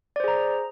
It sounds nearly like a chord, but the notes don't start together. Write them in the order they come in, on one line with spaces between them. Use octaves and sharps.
D5 C5 G#4 A#5